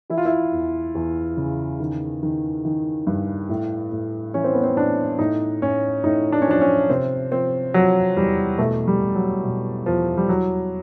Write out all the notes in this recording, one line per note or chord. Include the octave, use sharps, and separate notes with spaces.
E3 E4
F4
E4
E2
E2
C#3
D#3
D#3
D#3
G2
A2
A2
E3 C#4
C4
B3
C4
A2 D4
A2 D#4
A2 C#4
A2 D#4
D4
C#4
F3 D4
C#4
C3 C4
F3 C4
F3 F#3
E2 G3
B2 A3
G3
B2
F#3
B2
E2 F3
G3
E3 F#3